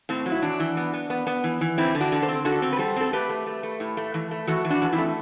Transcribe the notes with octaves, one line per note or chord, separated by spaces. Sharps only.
A2 C4
F#3
E4
E3 D4
E3
B3
B3
B3
B3
E3
E3
D3 C4 E4
D3
D4 F#4
D3
A4 C5
C4
D3 F#4 A4
C4
B4
G3 A4 C5
C4 A4
A3 G4 B4
A3
A3
A3
A2
A3
E3
A3
E3 F#4 A4
E3
D4 F#4
E3
C4 E4
A3